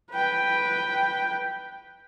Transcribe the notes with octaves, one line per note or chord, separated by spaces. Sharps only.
B4 G5